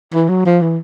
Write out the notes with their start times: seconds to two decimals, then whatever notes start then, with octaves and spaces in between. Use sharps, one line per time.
0.14 E3
0.29 F#3
0.45 F3
0.61 E3